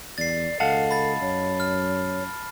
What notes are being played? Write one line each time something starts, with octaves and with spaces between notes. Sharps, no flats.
E2 D5 A6 C7
C#2 A4 D#5 F5 F#5 A5
B5 A6
F#2 C#5
F6